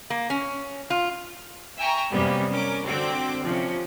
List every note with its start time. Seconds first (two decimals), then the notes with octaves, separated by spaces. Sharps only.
0.10 A#3
0.30 C#4
0.90 F4
1.77 E5 G5 G#5 A#5 C#6
2.11 F#2 C3 G3 A#3 B3 C#4
2.50 C#4 A#4 D6
2.85 D3 C4 F#4 G5 D6
3.44 C3 F3 C#4